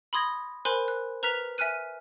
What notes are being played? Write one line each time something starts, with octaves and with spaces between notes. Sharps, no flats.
B5 C6 D#6 G#6 A#6
A#4 C5 G#5 B5 C6 F#6
F#6
B4 A#5 F6 F#6 B6 F7
E5 G#5 F6 F#6 D#7